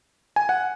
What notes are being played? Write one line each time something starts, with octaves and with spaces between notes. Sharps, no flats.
G#5
F#5